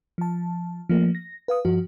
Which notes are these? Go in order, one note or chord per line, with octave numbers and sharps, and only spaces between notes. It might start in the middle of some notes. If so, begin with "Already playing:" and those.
F3 A5
F3 A3 A#3
A#6
B4 F5 D#6
G2 F3 F#4